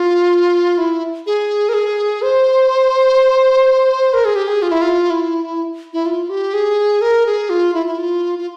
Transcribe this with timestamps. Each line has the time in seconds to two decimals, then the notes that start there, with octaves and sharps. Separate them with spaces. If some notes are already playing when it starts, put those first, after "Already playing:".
Already playing: F4
0.78 E4
1.26 G#4
1.69 A#4
1.74 G#4
2.22 C5
4.14 A#4
4.25 G#4
4.36 G4
4.48 G#4
4.62 F4
4.71 E4
4.82 F4
5.10 E4
5.93 E4
6.06 F4
6.30 G4
6.54 G#4
7.02 A#4
7.26 G#4
7.50 F4
7.74 E4
7.86 E4
7.98 F4
8.39 F4